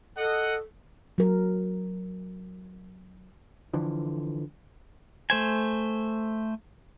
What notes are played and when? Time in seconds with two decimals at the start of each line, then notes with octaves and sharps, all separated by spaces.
0.17 A4 D#5 F#5
1.18 F#3 A#4
3.74 D3 E3 F3
5.30 A3 C5 G#5